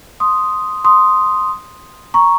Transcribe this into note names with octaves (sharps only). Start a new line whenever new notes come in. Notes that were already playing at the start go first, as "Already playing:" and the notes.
C6 D#6
C6 D#6
A#5 C#6